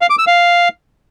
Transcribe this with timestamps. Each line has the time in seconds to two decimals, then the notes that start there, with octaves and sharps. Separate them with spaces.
0.01 F5
0.10 D6
0.18 E6
0.27 F5